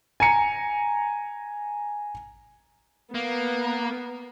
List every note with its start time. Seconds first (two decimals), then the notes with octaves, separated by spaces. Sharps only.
0.20 G#5 A#5 C#7
3.15 A#3 B3